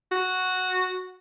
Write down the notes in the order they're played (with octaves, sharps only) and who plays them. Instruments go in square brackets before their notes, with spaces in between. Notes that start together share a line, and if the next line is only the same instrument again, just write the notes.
[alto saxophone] F#4